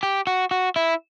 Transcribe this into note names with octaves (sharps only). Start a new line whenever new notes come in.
G4
F#4
F#4
E4